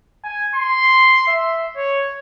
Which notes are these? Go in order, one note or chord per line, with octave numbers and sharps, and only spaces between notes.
G#5
C6
E5
C#5